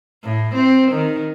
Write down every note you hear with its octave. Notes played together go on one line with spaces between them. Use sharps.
A2
C4
D#3